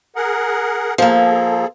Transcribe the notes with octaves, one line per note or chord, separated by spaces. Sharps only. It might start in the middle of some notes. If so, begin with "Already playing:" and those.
G#4 A#4 F#5
F3 A#3 G#4 A4